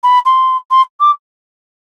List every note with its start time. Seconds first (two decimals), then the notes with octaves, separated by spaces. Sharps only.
0.03 B5
0.25 C6
0.71 C6
1.00 D6